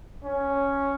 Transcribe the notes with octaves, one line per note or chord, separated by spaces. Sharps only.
C#4